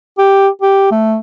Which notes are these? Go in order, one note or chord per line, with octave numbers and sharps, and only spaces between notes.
G4
G4
A3